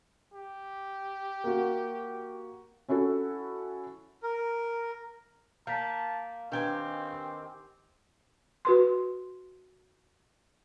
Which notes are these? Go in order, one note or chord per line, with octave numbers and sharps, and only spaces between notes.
G4
A#3 F#4
C#4 E4 F#4 A4
A#4
A#3 F5 A5 G6 B6
D#3 C4 D4 G4 B4 G#5 G6
F#4 B4 C6